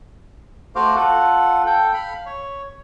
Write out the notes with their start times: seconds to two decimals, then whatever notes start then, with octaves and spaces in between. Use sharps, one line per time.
0.75 A3 F#4 C5 F5 D6
0.96 F4 A4 F#5
1.66 A4 G5
1.94 F5 B5
2.26 C#5